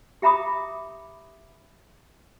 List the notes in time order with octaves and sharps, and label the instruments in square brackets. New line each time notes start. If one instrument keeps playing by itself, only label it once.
[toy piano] G4 E5 A#5 B5 D6 D#6